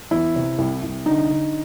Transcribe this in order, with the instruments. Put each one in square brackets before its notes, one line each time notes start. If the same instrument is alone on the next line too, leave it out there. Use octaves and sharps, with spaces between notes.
[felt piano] E2 E4
C3
C2
C2
D3 D#4
D3